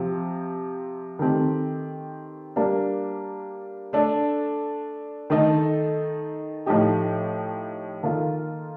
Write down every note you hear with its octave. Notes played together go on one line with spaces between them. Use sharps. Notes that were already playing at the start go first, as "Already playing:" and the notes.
Already playing: C3 F3 C4
D#3 A3 C4 G4
G3 A#3 D4
A3 D4 A4
D#3 A3 D#4 A4
A2 F3 A3 D#4 G4
D#3 A#3 F4 A4